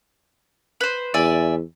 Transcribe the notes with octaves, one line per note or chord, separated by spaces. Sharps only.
B4 C5
E2 D5 E5 G#5